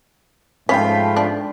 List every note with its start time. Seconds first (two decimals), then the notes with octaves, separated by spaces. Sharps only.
0.69 G#2 F3 A3 C#4 F4 G5 B5 B6
1.17 D4